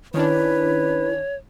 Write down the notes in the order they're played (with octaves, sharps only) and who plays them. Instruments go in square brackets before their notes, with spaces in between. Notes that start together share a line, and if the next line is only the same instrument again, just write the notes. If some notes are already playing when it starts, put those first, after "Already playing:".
[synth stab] D#3 C#4 D4 [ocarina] E4 [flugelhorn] B4 [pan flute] C#5